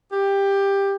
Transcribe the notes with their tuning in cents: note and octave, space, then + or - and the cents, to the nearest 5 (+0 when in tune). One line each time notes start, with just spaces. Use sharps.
G4 +15